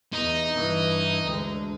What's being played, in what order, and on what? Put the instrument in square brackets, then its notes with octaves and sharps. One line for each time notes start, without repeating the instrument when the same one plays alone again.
[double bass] E2 [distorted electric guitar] D#4
[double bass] G2 E3
D2 G#3